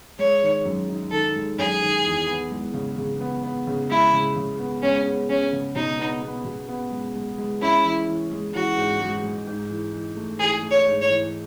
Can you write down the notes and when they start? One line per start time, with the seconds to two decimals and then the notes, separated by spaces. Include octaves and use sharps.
0.19 G#3 C#5
0.43 D#3
0.65 F#2
0.88 D#4
1.11 D#3 A4
1.35 G#3
1.58 F#2 G#4
1.82 D#3
2.05 E2
2.27 B3
2.51 G#3
2.74 C#3
2.98 C#3
3.20 B3
3.44 B3
3.67 C#3
3.90 G#3 E4
4.13 C#3
4.36 C#3
4.59 B3
4.82 G#3 C#4
5.06 B3
5.29 G#3 C#4
5.53 C#3
5.75 B2 D#4
5.99 B3
6.22 B3
6.45 B2
6.68 B3
6.91 G#3
7.15 G#3
7.38 G#3
7.61 C#4 E4
7.84 E3
8.07 E3
8.31 G#3
8.54 E3 F#4
8.77 G#2
9.00 G#3
9.24 G#3
9.47 G#2
9.69 E3
9.93 E3
10.17 A3
10.39 E3 G#4
10.62 A3
10.71 C#5
10.86 G#2
11.02 C#5
11.09 E3